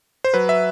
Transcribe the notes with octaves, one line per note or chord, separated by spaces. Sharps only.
C5
F#3 B4
E5